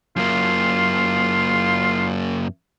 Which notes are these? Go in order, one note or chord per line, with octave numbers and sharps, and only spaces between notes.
F#2 A#3 F4